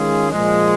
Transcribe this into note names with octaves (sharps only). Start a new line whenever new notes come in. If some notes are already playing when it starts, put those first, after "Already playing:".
Already playing: D#3 G#3 C#4 F4 G#4
A#2 F3 G#3